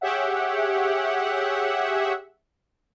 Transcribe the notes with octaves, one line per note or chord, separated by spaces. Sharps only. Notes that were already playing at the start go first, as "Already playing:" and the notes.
G4 G#4 C#5 E5 F#5